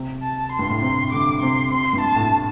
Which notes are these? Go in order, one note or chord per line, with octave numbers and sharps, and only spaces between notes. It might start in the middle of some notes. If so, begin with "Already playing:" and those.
Already playing: C3
A5
C6
G2
A2
C3 C6
D3 D6
C3 C6
C3 C6
G2
A5
A2